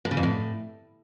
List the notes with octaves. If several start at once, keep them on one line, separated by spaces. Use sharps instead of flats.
A2
C#3
F2
A2